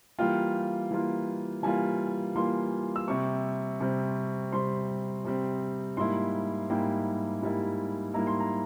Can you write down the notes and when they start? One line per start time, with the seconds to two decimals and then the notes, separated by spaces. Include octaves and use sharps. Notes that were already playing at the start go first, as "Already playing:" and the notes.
0.19 E3 G3 A#3 F4 G5
0.91 E3 G3 A#3 F4
1.63 E3 G3 A#3 F4 G#5
2.35 E3 G3 A#3 F4 C6
2.96 E6
3.07 C3 G3 C4 C#6
3.80 C3 G3 C4
4.52 C3 G3 C4 C6
5.25 C3 G3 C4
5.97 G#2 G3 A#3 E4 C6
6.70 G#2 G3 A#3 E4 G5
7.42 G#2 G3 A#3 E4
8.14 G#2 G3 A#3 E4 A#5
8.27 C6
8.40 A#5